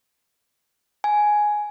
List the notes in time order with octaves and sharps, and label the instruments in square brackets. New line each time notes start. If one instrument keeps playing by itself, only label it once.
[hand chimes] G#5